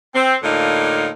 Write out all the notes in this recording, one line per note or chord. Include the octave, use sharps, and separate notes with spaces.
C4
A2 D3 A#3 D#4 F4